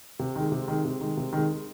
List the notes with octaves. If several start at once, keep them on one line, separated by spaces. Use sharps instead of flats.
C3
D#3 G#3
C3
D#3 G#3
C3
D#3 G#3
C3
D#3 G#3